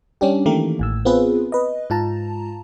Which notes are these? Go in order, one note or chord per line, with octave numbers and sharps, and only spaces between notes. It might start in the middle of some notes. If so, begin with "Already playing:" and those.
G3 C#4 D4 G4
D#3 E3 A3 A#3 G4 A#4
A1 A2 E6
B3 C4 F4 G#4 B4
B4 D#5
G#2 F4 A5 A#5